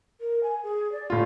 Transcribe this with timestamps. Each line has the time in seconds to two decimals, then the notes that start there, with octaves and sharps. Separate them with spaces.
0.21 A#4
0.43 G#5
0.63 G#4
0.92 D5
1.10 A2 F4